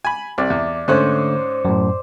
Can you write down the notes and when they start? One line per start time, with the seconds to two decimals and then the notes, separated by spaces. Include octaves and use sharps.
0.05 G#5 B5
0.38 C2 D5
0.50 E2
0.88 G#2 D3 A3 C#4 C5 F#6
1.65 F#2 A2